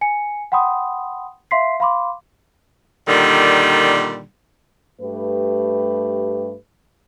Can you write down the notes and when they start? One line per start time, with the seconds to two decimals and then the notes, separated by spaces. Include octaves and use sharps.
0.01 G#5 C#7
0.52 F#5 G5 B5 C6 D#6
1.51 E5 F5 C6 B6 C7
1.80 F5 B5 C6 D6
3.08 A#2 D3 D#3 G3
5.02 G2 A3 G4 B4